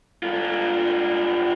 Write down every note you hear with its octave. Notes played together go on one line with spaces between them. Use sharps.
G2 F4